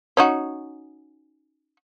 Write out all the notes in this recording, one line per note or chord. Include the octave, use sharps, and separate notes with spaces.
C#4 D#4 F#4